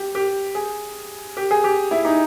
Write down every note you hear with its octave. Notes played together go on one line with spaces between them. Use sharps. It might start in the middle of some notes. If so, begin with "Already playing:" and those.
Already playing: G4
G4
G#4
G4
G#4
G4
E4
D#4